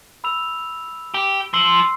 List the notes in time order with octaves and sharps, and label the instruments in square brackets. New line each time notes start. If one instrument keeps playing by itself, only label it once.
[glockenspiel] B5 E6 F7
[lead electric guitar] G4
[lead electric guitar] F3 [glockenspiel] C6 E6 C7